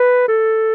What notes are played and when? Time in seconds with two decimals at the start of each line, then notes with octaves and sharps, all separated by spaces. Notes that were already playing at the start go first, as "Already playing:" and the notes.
Already playing: B4
0.28 A4